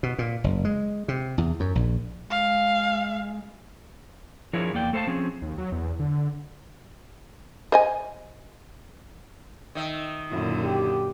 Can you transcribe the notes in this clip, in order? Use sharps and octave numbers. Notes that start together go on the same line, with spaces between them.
B2
A#2
F#1
G#3
C3
E2
F#2
A#1
G#3 F5
F3 D4 E4 G#4 A#4 C#5
E2 A#3 D5 G5
A3 A4 C5 E5 F5 A5
F3 C4 C#4 G#4
D#2
F#3
E2
D3
C5 D#5 G#5
D#3 E5
F#2 A#2 D3 E4
G4